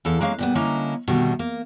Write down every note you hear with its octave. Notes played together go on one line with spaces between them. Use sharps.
E2 E4 A4 F5
G#3 A#3 C#4 F5
A#2 G3 B3
D3 A#3 C#4 E4 D#5 A#5
B2 D3 D#3 G3 A3 C4
A#3